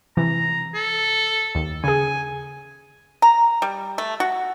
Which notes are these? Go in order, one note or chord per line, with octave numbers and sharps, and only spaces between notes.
C3 E3 A#5
A4
D#2
C#3 G#4 G#5
A#5
G3
A3
F#4